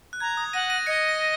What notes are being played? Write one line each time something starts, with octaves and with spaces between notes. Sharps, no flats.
F#6
A#5 G#6
D#6
F#5 A#6 D#7
A#6 D#7
D#5 G#6 C#7
A#6